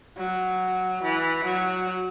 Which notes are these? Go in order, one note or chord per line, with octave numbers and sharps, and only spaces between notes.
F#3
E3
F#3